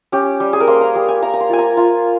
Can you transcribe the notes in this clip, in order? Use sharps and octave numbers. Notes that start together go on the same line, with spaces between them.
C#4 G4
G3
G#4
A#4
A#3 C5
A#5
G3
G#5
A#3 A#5
A#5
C6
F4 G#5
A#5
F4